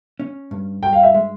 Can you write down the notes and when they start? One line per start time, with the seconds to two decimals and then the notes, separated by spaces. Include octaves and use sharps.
0.20 C#4
0.51 G2
0.83 G2 G5
0.93 F5
1.03 E5
1.14 G#3